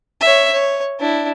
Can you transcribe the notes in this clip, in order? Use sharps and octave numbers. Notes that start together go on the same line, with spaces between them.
C#5 E5
C#5
D4 E4